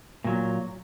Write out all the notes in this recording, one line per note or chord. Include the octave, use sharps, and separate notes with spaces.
A#2 F#3